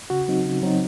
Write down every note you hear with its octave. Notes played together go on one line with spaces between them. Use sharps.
C#3 F#4
F#3 C4 D#4
C#3
F#3 C4 D#4